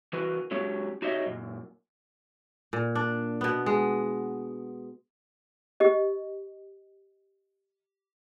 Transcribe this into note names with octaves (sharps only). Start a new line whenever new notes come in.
E3 F#4 A#4 B4
F#3 G#3 C#4 G4 C#5
D#4 F#4 G4 C#5 D#5 E5
F#2 A#2
A#2
D4
B2 B3
G#3
G4 D#5